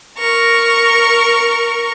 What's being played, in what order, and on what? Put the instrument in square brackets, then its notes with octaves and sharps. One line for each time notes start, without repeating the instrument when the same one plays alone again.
[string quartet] A#4 C#6